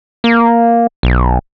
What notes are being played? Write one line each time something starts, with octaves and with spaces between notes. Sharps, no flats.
A#3
B1